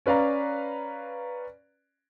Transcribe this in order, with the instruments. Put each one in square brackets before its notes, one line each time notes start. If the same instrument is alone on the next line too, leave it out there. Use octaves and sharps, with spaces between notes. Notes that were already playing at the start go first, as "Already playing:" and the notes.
[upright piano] C#4 B4 D5 F5 A#5